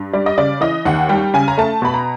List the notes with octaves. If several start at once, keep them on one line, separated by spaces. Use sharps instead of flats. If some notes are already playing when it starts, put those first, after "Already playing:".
Already playing: G2
G3 D5
D#5
C#3 D5
E3 D#5
D#2 F#5
G3 G5
C#3 G#5
A#5
A3 A5
B2 B5
A#5